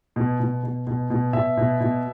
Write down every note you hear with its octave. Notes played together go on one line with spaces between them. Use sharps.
B2
B2
B2
B2
B2
B2 E5
B2
B2